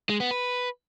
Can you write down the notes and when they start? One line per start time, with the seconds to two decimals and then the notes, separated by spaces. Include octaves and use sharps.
0.10 G#3
0.20 B3
0.31 B4